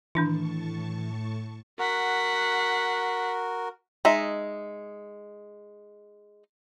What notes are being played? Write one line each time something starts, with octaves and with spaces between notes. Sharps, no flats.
A2 D#3 E3 D4 E4 A5 C#6
F#4 A#4 F#5 B6
G#3 D#4 E5